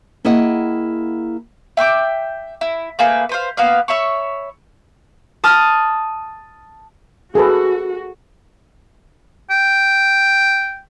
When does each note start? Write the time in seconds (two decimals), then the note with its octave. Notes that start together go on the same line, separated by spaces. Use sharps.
0.25 A#3 E4 G#4 D#5 F#5 G5
1.77 E5 G5 C6 D6
2.61 E4
2.99 A3 A#3 G#4 B4
3.29 B4 C5 F5
3.57 A#3 B3 B4 F5
3.88 C#5 E5 B5 C#6
5.44 A5 D#6 F6
7.35 F#4 G#4 A4 B4
9.50 G5